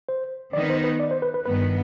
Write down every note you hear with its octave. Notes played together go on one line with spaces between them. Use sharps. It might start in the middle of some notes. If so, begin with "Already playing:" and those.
C5
D#3 B3 D#4 D5
C5
B4
D5
C5
B4
B4
G2 D#3 B3 B4